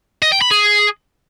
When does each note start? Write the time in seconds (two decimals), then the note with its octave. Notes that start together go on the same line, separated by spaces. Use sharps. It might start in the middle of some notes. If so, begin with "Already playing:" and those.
0.22 D#5
0.32 G5
0.42 B5
0.51 G#4